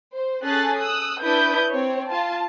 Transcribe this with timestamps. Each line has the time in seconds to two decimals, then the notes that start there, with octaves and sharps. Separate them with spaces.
0.11 C5
0.43 C#4 G#4 A4 F#6 A6
0.81 D#6 E6 F#6
1.23 D4 E4 B4 D#6 G6
1.69 C4 C#5
2.08 F4 A5